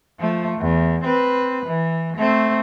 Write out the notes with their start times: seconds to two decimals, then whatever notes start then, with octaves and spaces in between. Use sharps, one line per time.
0.20 F3 A3
0.58 E2
1.04 C4 B4
1.66 E3
2.17 A3 C4